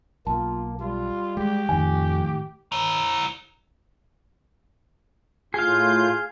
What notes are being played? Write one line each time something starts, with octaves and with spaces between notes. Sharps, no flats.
B1 A#3 F4 A5
G3 F4
G#3 G4
F2 A2 D#3 G#5
E4 A#5
A2 F4 G#4 F5 G6